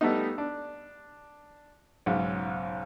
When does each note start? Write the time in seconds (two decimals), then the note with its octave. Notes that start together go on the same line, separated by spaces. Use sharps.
0.01 G3 A3 B3 D#4
0.38 D4
2.06 B1 G#2 C#3